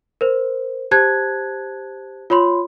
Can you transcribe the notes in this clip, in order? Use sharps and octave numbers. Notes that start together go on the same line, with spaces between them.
A#4 C5
G4 C5 A5 F#6 G#6
F4 C#5 B5 C6